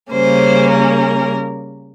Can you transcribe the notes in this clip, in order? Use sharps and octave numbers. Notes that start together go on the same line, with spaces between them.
C#3 G3 A#3 C#4 C5
A#4